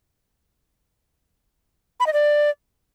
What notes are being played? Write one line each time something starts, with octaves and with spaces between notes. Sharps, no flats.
B5
D#5
D5